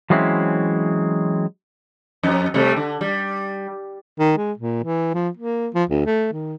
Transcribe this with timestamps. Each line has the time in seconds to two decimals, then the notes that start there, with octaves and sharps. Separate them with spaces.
0.10 E3 F#3 G#3 C4 C#4 E4
2.23 F2
2.54 C3 G3 A3
2.76 D3
3.01 G3
4.19 D#3
4.37 G#3
4.57 A#2
4.83 E3
5.14 F3
5.37 A#3
5.74 F3
5.89 D2
6.06 A3
6.33 D#3